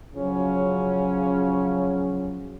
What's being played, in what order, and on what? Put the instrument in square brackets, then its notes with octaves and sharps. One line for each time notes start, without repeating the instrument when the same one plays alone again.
[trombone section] C#3 F3 F#3 C#4